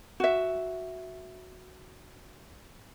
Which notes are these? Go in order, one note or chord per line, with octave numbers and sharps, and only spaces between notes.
F#4 E5